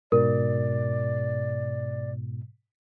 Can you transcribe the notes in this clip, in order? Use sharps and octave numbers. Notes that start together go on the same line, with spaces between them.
G#2 B2 A#4 D5